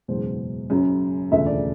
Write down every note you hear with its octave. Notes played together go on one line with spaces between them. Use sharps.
F#1 E2 B2 G#3 C5
F#1 F#2 C#3 F#3
E1 D2 C#3 F3 A3 E5
D5